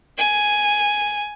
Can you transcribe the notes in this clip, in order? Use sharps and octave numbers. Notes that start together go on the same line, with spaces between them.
G#5